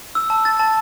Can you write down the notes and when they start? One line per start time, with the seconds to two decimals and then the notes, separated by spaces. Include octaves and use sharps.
0.15 E6
0.30 A5
0.45 A6
0.60 A5